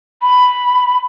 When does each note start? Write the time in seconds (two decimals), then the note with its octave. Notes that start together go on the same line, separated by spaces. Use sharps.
0.22 B5